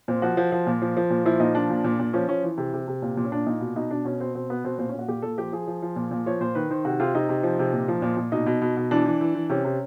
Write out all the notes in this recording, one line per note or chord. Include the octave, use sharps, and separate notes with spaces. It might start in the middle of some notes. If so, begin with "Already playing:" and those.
A#2 C4
F3 F#4
F3
F3
A#2
F3
F3
A#2
F3 E4
A#2 D#4
F3 D4
A#2
A#2
A#2
F3 C#4
F3 C#4
E3
C3
C3
C3
A#2
A#2
C#4
A#2 D4
A#2 D#4
B2
B2 D#4
B2 D4
B2 C#4
B2 C4
B2 C4
B2 B3
B2 C4
A#2 C4
C#4
A#2
F#4
A#2 G4
A#2 A4
F3 G4
F3 G#4
F3
F3
A#2
A#2
F3 C#5
A#2 C5
D#3 B4
D#3 C5
C3 F#4
C3 F4
C3 D#4
C3
F3
C3
A#2
F3
A#2
A#2
B2 D#4
B2
B2
B2
E3 D4
E3
E3
E3
C3 C#4
C3